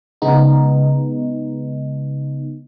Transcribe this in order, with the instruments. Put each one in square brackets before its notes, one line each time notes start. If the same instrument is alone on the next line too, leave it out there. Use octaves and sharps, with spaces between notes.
[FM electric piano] C#3 G#3 B3 D#4